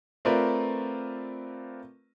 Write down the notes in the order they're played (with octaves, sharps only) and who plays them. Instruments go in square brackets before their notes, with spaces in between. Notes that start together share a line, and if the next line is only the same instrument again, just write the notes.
[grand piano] A3 C4 F4 A#4 B4 D5